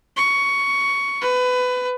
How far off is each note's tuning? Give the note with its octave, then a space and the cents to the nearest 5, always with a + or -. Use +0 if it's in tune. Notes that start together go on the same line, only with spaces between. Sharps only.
C#6 +10
B4 +20